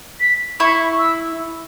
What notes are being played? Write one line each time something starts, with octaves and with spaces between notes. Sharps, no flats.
B6
E4 C#6
E6